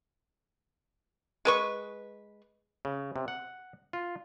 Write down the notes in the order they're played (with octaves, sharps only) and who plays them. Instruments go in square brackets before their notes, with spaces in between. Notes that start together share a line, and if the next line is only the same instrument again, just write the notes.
[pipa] G#3 B4 C#6
[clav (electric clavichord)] C#3
C3
F#5
F4